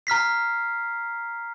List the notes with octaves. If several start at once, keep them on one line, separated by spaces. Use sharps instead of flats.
A#5 F6 B6 C7